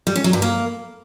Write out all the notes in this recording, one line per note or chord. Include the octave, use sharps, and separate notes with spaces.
G3
C#4
F#3
G2
A#3